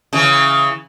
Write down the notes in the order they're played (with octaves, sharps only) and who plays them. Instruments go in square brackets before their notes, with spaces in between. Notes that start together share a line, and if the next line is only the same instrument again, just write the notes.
[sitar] C#3 E3